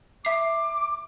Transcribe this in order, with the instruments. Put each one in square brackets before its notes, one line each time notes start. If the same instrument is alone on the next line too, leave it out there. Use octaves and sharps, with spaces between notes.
[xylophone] E5 C7 [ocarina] D6